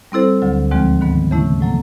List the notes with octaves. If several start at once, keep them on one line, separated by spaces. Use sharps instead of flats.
G3 C4 E4 A4 C5
D2 D3 F#3
D#2 D3 F3 G#3 C4
G#2 D#3 F#3 B3
C#3 E3 A3 C#4 E4
A2 F#3 A#3